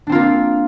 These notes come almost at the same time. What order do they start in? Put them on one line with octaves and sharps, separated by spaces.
D4 C4 F4 A#3